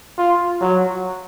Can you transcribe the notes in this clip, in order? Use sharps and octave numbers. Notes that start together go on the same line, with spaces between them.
F4
F#3